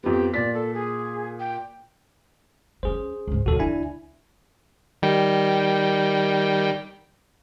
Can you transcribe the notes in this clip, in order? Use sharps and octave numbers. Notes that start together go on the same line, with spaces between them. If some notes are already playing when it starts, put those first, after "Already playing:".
F2 B3 G4
A#2 D5 B6
A4
G#4
G5
C4 C#4 G#4 C5
C#2 G#2
D#2 A#2 F#4 A4
D2 D3 D4 E4 G#5
D#3 G3 G5